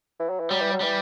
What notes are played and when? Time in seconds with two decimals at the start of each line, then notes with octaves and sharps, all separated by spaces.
0.20 E3
0.30 F#3
0.40 E3
0.51 F#3 G3
0.61 E3
0.72 F#3
0.81 E3 G3